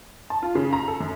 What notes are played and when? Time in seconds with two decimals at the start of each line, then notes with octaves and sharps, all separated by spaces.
0.30 A5
0.43 F4
0.55 C#3
0.73 A#5
0.88 A4
1.00 F#2